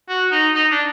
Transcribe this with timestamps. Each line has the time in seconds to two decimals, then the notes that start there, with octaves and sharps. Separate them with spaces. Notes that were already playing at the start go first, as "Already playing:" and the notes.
0.09 F#4
0.32 D#4
0.55 D#4
0.71 D4